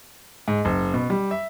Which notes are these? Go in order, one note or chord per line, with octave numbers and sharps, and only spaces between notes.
G#2
F#1
B2
G3
E5